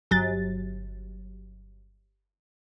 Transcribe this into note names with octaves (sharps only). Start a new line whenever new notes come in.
G1 F#3 A6